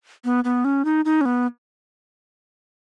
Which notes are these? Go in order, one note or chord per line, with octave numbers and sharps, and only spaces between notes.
B3
B3
C#4
D#4
D#4
C#4
B3